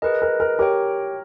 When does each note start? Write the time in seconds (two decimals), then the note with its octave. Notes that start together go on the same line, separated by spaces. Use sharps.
0.02 G#4 A#4 B4 D#5
0.22 A#4
0.40 A#4
0.59 G4 A#4 C#5 G5